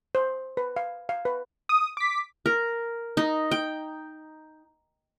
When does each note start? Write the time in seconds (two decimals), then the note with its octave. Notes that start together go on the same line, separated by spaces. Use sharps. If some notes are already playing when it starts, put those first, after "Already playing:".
0.15 C5
0.57 B4
0.76 F5
1.09 F5
1.25 B4
1.69 D#6
1.97 D6 B6
2.46 A#4
3.17 D#4
3.51 G5